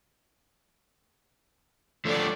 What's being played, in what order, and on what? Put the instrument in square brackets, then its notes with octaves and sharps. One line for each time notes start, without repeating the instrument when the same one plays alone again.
[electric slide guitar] F3 A3 D4 [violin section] A4 C#5 D5